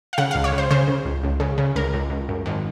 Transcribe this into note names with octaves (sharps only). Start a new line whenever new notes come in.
F5
C#3 F#5
C#2 F5
C#5
C#3
C5
C#3 C5
C#3
C#2
C#2
C#3
C#3
C#2 A#4
C#2
C#2
F#2
G#1